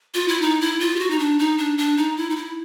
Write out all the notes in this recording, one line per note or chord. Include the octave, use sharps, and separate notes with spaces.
F4
E4
D#4
E4
F4
G4
F#4
D#4
D4
D#4
D4
D4
D#4
E4
D#4
E4